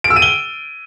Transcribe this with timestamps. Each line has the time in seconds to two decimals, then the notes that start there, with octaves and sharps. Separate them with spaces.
0.04 D7
0.10 E6
0.16 D#7
0.22 G7